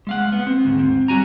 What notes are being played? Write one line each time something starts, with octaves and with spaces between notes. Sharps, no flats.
G#3 F5 F#5
B3
C4
D2 G#2
C4
G3 F#4 G#5 A#5